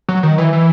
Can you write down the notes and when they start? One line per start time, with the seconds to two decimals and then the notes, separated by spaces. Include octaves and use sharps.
0.09 F#3
0.23 D#3
0.38 E3
0.53 E3